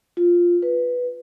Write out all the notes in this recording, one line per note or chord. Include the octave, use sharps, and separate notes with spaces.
F4
B4